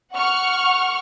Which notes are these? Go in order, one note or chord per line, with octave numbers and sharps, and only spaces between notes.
F#5 C#6 F6